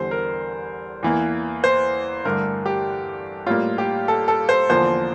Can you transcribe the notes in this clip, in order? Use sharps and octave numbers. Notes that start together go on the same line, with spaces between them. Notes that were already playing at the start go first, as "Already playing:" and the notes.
Already playing: E2 D3 G3 C5
A#4
E2 E3 A#3
C5
G2 D3 A3 A#4
G4
A2 G3 A#3 F4
G4
A4
A4
C5
E2 D3 F3 A#3 C5